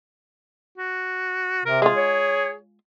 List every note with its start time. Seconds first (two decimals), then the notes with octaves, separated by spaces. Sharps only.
0.78 F#4
1.65 C3 A#4
1.82 G#3 F4 G#4
1.96 C#5